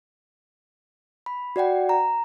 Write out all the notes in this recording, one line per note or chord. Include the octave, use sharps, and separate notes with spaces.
B5
F#4 D5 F#5 G5
A#5